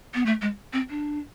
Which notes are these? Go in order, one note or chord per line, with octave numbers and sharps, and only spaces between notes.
B3
A3
G#3
C4
D4